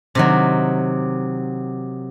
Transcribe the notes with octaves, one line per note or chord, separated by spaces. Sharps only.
C3 D#3 F#3